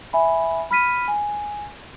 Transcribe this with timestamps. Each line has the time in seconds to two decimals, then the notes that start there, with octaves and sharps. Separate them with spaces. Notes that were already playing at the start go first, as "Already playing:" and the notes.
0.13 E5 G#5 B5
0.71 B5 F6 B6 D#7
1.08 G#5